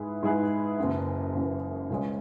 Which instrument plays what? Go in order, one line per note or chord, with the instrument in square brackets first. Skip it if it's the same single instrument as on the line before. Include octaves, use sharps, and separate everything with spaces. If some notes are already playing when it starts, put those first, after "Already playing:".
Already playing: [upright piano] G#2 G#3 E4 G#4 B4
G#2 G#3 E4 G#4 B4
F#1 F#2 E3
F#1 F#2 E3
C#2 C#3 G#3 C#4